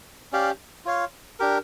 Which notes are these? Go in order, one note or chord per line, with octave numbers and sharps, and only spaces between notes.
C#4 G4 D5 F5
F4 C#5 F5
D4 G4 A#4